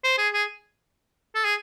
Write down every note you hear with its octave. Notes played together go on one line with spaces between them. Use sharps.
C5
G#4
G#4
A4
G#4